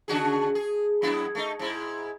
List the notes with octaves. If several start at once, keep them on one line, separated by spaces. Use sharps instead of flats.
C#3 F#4 G#4
G#4
F#2 B3 E4
A3 D#4
G#2 E4